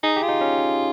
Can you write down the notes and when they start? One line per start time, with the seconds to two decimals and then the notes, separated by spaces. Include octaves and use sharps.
0.03 D#4 G#4
0.17 G4
0.22 F4
0.29 D#4
0.41 C#4